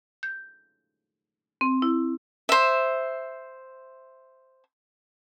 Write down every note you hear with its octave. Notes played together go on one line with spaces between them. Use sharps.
G6
C4
E4
C5 E5